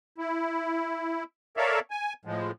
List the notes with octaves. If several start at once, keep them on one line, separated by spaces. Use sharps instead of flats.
E4
A4 A#4 C#5 D5 E5 F5
G#5
A2 F3 G#3